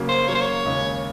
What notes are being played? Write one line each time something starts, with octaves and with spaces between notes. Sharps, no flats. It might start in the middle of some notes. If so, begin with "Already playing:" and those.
Already playing: C#3 F#3 A#3
C5
C#3 F#3 A#3 C#5
C5
C#5
D#2 C#3 G#3